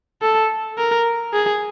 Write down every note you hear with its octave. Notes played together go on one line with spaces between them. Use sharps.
A4
A#4
G#4